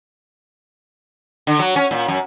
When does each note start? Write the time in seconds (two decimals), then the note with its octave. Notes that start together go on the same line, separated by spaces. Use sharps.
1.47 D3
1.59 F#3
1.76 C#4
1.91 A#2
2.08 F#2